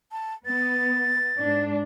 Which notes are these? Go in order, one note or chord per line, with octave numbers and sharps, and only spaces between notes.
A5
B3 A6
G#2 D4